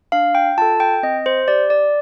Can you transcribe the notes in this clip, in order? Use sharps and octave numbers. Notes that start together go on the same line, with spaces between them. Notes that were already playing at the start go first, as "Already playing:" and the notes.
D4 F5
G5
F4 A4 A5
G5
C4 D#5
C5
G4 D5
D5